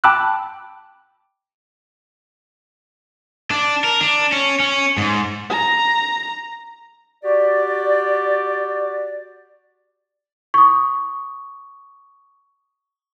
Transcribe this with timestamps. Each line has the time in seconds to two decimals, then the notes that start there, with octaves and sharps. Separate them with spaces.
0.04 G5 A5 B5 D6 E6 F#6
3.51 D4
3.84 A#4
4.01 D4
4.32 C#4
4.60 C#4
4.98 G#2
5.50 A#5
7.23 F#4 G4 D5
10.54 C#6 D#6